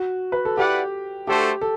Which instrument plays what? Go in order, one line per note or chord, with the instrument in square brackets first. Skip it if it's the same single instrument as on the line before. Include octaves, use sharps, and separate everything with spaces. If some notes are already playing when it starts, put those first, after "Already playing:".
Already playing: [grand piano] F#4
B4
A4
[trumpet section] E4 B4 D5 F#5 [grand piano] G4
[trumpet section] A3 D4 F#4 A4 C5 [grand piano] G4
[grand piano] A4